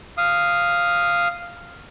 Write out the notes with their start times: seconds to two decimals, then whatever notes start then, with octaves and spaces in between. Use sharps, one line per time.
0.18 F5 D#6